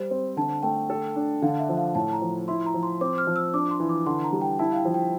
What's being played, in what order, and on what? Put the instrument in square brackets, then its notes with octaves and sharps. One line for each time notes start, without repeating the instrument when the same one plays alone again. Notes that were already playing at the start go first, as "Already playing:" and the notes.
Already playing: [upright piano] G3 [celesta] C5
[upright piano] C4
[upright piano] D3 [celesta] A5
[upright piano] A3 [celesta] G5
[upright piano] A4
D4
[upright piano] D3 [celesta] F5
[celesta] E5
[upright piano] F3
[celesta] F5
[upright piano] A2 [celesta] A5
[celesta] A#5
[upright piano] F3
[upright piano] E4 [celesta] C6
[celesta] A#5
[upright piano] F3
[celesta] C6
[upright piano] C4 [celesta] D6
[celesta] F6
[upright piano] F3
[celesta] E6
[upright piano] D4 [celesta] D6
[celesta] C6
[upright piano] E3
[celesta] D6
[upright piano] D3 [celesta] C6
[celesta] A#5
[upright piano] G3
[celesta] G5
[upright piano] E4 [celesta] A5
[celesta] F5
G5
[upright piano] F3
[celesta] G5